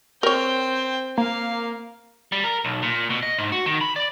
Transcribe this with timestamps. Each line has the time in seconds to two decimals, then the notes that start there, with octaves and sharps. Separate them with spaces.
0.23 C4 A#4 C#5 G5
1.18 A#3 F5
2.32 G3
2.44 A#4
2.65 B1
2.82 A#2
3.10 B2
3.23 D#5
3.38 G#2
3.52 F#4
3.66 D#3
3.81 B5
3.96 D5